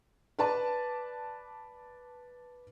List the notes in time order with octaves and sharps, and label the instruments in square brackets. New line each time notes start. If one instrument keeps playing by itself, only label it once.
[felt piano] B4 D5 A5